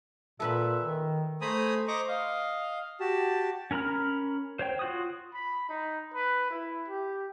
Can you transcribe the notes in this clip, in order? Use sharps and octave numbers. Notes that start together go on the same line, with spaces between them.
A#2 A4 B4 E5 B5
D#3
A3 C5 G#5 A#5 B5 D#6
C5 D#5 A#5 C#6 D6
D#5 F5
F#4 G4 A5
C#4 A#4 A#5 B5 F6
C5 C#5 G5
F4 F#4 D#6
B5
D#4
B4
E4
G4